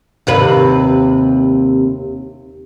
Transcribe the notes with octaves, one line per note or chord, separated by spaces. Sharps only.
D#2 C3 B4